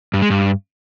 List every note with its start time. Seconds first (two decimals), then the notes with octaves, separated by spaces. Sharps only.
0.14 G2
0.22 G#3
0.30 G2